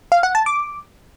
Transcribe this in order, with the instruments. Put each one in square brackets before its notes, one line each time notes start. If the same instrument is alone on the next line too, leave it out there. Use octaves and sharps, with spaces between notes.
[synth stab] F5
F#5
A5
D6